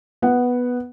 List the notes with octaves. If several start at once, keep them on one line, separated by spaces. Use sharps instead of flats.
B3 F#5